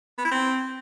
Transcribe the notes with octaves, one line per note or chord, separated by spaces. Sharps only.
B3
E4
C4